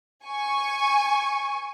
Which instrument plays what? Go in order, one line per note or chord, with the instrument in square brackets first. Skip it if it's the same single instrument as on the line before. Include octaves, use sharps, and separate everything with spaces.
[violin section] G#5 C#6